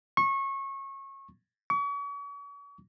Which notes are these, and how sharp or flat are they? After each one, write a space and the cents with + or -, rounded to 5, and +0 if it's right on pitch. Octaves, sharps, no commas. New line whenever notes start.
C#6 -25
C#6 +40